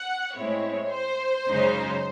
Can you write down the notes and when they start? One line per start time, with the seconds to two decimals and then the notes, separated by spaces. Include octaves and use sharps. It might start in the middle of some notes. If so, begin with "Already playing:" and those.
Already playing: F#5
0.35 A2 G#3 C4 E4 C#5
0.92 C5
1.49 F#2 C#3 G#3 D#4